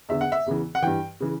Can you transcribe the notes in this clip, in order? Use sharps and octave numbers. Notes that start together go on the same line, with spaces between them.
E2 D3 E5
F#5
E5
E2 C#3 E3
F#5
G2 E3 G5
C#3 E3